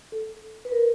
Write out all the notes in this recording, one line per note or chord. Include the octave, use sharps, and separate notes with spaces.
A4
B4
A#4